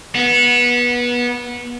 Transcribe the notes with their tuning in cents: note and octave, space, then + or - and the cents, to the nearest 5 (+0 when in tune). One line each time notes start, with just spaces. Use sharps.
B3 -25